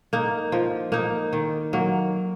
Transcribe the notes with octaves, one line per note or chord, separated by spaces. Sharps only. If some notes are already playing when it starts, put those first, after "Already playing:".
A#3 D#4
F3
A#3 D#4
D#3
F#3 A#3